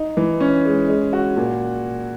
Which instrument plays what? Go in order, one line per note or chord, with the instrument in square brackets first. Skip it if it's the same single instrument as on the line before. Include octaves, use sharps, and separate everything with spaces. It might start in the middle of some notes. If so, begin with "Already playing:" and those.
Already playing: [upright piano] D#4
E3
C#4
G#3
G#3
F#4
A#2